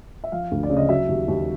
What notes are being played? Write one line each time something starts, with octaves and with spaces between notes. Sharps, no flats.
E5
F3 F5
D2
D5
C#3
D#5
F#3 E5
D#2
D#2